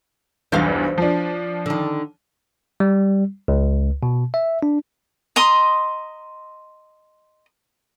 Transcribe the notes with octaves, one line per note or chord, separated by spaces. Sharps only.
B1 E2 G2 C5 F5
F3 D4
D3 D#3
G3
C#2
B2
E5
D4
D#5 A#5 C6 D#6